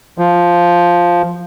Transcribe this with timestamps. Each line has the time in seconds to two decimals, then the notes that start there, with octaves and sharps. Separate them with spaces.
0.18 F3